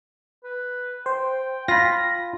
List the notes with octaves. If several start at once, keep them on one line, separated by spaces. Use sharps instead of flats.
B4
C5 G5
F4 B5 A#6